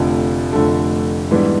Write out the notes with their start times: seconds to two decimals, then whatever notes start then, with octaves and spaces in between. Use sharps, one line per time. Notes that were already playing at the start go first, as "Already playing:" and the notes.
Already playing: F1 F2 D3 F3 A3
0.53 F1 F2 D3 F3 A3
1.31 G#2 E3 G3 B3 D4